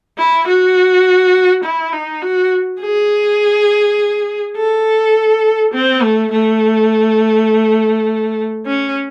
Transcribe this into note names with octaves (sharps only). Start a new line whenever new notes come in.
E4
F#4
E4
D#4
F#4
G#4
A4
C4
A3
A3
C#4